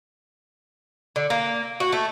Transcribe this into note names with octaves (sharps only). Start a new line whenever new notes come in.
D3
A#3
F#4
A3